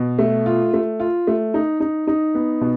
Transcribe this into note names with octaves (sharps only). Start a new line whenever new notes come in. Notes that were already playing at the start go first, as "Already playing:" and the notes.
Already playing: B2
A3
F4
A3
F4
A3
D#4
D#4
D#4
B3
B2